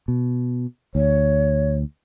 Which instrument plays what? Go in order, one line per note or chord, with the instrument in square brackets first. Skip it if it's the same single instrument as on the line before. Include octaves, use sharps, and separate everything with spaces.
[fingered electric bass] B2
[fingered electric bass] D2 [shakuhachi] C#5